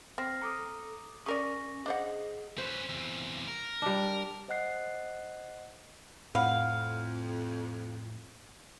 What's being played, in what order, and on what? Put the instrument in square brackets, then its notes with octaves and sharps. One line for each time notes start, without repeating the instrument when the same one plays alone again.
[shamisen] C4 [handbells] F6 A#6 C7
[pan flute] A4 [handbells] A#5 D6 D#6
[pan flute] C#4 [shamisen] G#4 A#4 D5 [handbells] C#6 A#6
[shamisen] D4 C5 F#5 [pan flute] G#4 [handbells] D#5
[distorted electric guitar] C#4 B4 [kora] C5
[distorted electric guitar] E2 C3
A#4
[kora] G3 D4
[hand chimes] C5 D#5 F#5 F#6 C7
[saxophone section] F2 [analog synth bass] A2 [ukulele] E4 F#5 B5 [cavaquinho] F5